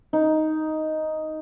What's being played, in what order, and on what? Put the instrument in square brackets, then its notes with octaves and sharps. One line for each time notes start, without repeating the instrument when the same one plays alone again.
[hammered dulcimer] D#4